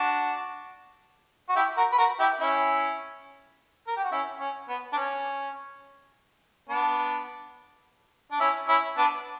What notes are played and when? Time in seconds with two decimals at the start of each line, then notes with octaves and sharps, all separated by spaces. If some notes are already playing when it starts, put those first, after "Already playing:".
Already playing: D4 F#4
1.49 F#4
1.56 E4 G4
1.77 F#4 A#4
1.93 B4
1.98 F#4 A#4
2.20 E4 G4
2.41 C#4 E4
3.87 A#4
3.96 G4
4.04 F#4
4.12 C#4 E4
4.40 C#4
4.69 B3
4.92 D4
4.97 C#4
6.69 B3 D4
8.31 D4
8.40 C#4 E4
8.68 C#4 E4
8.97 B3 D4